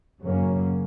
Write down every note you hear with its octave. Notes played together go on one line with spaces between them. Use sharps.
F#2 C#3 F#3 A#3 C#4